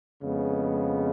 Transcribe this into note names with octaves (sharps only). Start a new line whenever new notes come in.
F2 C#3 G#3 B3